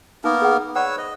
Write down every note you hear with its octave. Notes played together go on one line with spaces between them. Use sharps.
A#3 B3 D#4 A#4
G#4 F#5
B4 C#5 D5 F#5 E6
C5 D#5